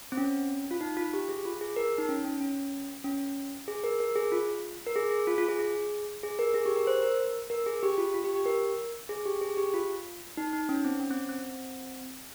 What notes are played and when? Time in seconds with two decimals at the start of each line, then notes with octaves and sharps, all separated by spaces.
0.12 C4
0.17 C#4
0.71 F4
0.81 D#4
0.97 F4
1.14 G4
1.29 G#4
1.45 F4
1.61 G#4
1.76 A#4
1.98 D#4
2.09 C#4
2.25 C#4
2.41 C#4
3.04 C#4
3.68 G#4
3.84 A#4
4.00 A#4
4.15 G#4
4.32 F4
4.87 A#4
4.96 G#4
5.11 G#4
5.27 F4
5.38 F4
5.49 G#4
5.59 G#4
6.23 G#4
6.39 A#4
6.54 G#4
6.66 G4
6.76 A#4
6.87 C5
7.02 A#4
7.50 A#4
7.66 G#4
7.83 G4
7.98 F4
8.14 F4
8.24 G4
8.35 G4
8.46 A#4
9.09 G#4
9.26 G4
9.41 G#4
9.57 G4
9.74 F4
10.37 D#4
10.53 D#4
10.69 C#4
10.85 C4
11.00 C#4
11.10 C4
11.29 C4